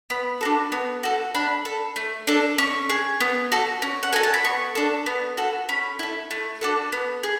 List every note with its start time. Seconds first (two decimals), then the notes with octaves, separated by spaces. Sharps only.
0.10 B3 B5
0.41 D4 F#4 A4
0.72 B3
1.03 F#4 A4
1.35 D4 B5
1.65 A4
1.96 A3
2.27 D4 A4
2.58 C#4 C#6
2.89 G#4
3.20 B3
3.52 F#4 A4
3.82 C#4
4.03 F#5
4.13 F#4 A4 G#5
4.23 A5
4.34 B5
4.44 B3 C#6
4.75 D4 A4
5.06 B3
5.37 F#4 A4
5.69 C#4 B5
5.99 E4 A4
6.31 A3
6.61 D4 F#4 A4
6.92 B3
7.23 G#4